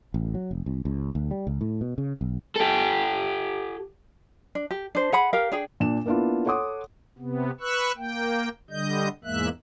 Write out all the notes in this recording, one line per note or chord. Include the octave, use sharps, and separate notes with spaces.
A1
F#3
F1
C2
C#2
D2
G3
C#2
A2
B2
C#3
B1
G4 A4
D4
G4
D4 C5
G#4 F#5 B5
G4 A#4 F5
D4 G#4 G5
A#2 D4 E7
A#3 B3 D4 E4 F4
A4 C#5 F#5 C6 D6 D#6
C3 B3
B4 C#6 E6 F#6
A#3 G5
D3 G3 D#5 G6
E2 G#2 G#3 A#3 E5 F#6